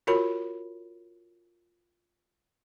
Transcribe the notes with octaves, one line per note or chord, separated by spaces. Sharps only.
F4 F#4 A#4 C#5 B5